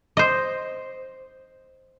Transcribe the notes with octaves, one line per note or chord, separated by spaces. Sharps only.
C5 D#5